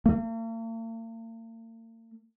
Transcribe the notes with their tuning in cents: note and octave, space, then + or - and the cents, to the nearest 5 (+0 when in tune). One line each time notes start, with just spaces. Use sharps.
A#3 -45